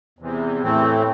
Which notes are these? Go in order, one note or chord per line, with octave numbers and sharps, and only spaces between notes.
E2 C3 E3
A2 E3 A3 C4